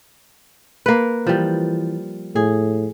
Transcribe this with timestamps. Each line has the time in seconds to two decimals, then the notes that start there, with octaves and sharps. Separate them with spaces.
0.86 A#3 B4
1.27 E3 F3 G3
2.36 A2 G#4